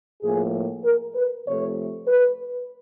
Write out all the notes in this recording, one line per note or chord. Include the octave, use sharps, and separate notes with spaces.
A2 F3 A#3 G#4
A#4
B4
C3 F3 A3 C#5
B4